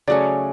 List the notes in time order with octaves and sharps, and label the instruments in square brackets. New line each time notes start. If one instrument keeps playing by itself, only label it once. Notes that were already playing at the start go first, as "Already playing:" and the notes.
[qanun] C#3 F#3 A3 C#4 [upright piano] D5